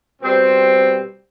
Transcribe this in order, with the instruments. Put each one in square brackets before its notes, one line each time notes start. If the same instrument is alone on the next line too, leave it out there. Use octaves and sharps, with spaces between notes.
[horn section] B2 G3 C4